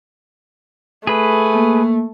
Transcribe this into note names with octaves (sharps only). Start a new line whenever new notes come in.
A3 G#4 B4
A#3